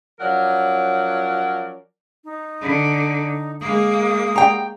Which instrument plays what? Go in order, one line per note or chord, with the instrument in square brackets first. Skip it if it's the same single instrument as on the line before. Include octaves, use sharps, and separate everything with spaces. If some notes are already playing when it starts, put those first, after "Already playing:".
[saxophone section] F3 F#3 C#4 A#4 D5 F#5
[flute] D#4
[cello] D3
[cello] G#3 A#3 [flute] D#6
[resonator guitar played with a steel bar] G5 A#5